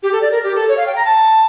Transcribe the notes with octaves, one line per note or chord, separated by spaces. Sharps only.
G4
A4
D5
A#4
G4
A4
C#5
F5
G5
A#5
A5